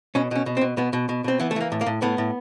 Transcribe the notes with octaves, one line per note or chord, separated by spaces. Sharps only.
B2 C#4
B2 C#4
B2
C4
B2
B2 B3
B2
B2
B2 C4
E3 B3
A3
E3 A#3
A2
A#3
A2
A2 B3
A2